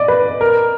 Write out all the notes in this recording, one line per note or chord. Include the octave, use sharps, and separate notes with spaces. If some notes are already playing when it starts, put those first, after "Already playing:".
Already playing: D5 D#5
B4
A#4